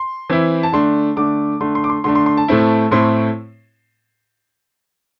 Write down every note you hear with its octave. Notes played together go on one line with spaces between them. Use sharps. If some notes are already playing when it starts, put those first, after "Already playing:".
Already playing: C6
E3 C4 E4
A5
D3 A3 D4 C6
D3 A3 D4 D6
D3 A3 D4 C6
C6
D6
C6
D3 A3 D4 C6
C6
C6
A5
A2 A3 C4 E4
A2 A3 C4 E4 C6